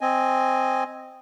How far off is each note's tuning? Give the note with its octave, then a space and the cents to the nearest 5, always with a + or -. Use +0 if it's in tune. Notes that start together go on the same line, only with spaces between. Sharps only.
C4 +0 D#5 +0 G#5 +0